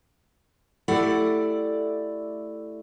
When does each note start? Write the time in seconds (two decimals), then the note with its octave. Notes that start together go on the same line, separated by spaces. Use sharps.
0.88 A3 E4 G4 A4 D5 F#5